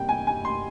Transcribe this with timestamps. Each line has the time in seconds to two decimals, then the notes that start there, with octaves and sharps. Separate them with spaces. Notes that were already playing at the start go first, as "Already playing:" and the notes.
Already playing: C3 G3 A#3 G5
0.09 G#5
0.27 G#5
0.45 C6